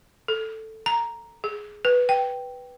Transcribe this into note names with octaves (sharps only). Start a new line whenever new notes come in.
A4
A#5
G#4
B4
G5